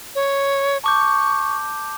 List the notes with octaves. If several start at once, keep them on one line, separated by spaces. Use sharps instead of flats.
C#5
A5 C#6 D6 G6